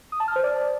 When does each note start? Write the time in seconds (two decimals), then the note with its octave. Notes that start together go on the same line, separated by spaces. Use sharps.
0.12 D#6
0.20 A5
0.28 F6
0.36 C5
0.44 D5